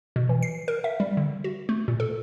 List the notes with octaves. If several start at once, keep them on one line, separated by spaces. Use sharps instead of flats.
B2
E3
C7
A#4
E5
G3
D3
F#4
A3
A#2
A4